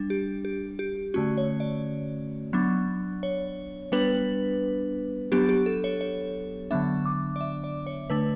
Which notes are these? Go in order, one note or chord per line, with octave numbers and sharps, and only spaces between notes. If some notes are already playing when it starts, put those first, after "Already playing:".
Already playing: G3 D4
G4
G4
G4
D3 A3 C#4 F#4
C#5
D5
F#3 B3 D4
C#5
G3 B3 D4 B4
F#3 B3 D4 G4
G4
A4
C#5
C#5
D3 F#3 B3 D4 E5
D6
D5
E5
D5
C#5
D3 A3 D4 B4